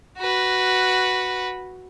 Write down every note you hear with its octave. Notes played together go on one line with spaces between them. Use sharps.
F#4 B4